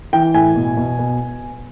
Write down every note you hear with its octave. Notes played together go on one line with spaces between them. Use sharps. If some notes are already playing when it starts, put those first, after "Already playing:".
E3 G5
A2 G#5
B2
B2
B2